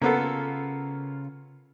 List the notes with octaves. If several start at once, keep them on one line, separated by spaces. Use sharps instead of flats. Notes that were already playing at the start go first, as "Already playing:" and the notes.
C#3 A#3 B3 F4 A4